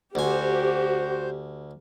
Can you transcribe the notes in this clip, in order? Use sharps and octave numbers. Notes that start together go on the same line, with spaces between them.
D2 F#4 G4 C5 G#5